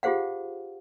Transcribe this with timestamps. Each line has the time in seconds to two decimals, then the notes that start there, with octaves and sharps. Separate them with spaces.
0.03 F4 G4 G#4 C5 F5 F#5